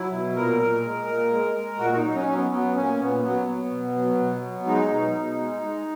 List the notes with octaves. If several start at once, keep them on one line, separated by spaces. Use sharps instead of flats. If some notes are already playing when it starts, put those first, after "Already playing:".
Already playing: F#3 E4
B2
A#2 A#4
A#2
G#3
A#2
G#3
G#3
A#2 F#4
D#4
F#3
C#4
F#3
B3
F#3 B3
A#2 C#4
A#2 B3
F#3 B3
F#3
B2
F#3
B2
F#3
G#3 D#4
B2
B2
G#3
G#3